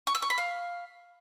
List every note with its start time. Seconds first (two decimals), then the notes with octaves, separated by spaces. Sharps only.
0.07 C#6
0.15 E6
0.22 C#6
0.30 B5
0.38 F5